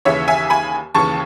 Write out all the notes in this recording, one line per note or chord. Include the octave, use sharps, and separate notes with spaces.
D#2 C#3 E3 C#5 E5
E5 G#5
G#5 B5
D#2 C#3 E3 A5 C#6